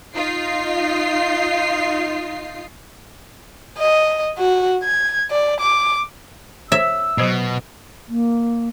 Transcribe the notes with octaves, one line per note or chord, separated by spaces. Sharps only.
D#4 F4 C7
D#5
F#4
G#6
D5
D6
C5 C#5 E5 E6
B2 F#3 C5 D#5
A#3